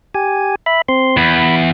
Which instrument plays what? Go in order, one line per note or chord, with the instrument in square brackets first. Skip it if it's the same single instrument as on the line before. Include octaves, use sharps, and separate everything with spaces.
[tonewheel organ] G4 G#5
E5 B5
C4 C6
[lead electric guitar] E2 [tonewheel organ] B5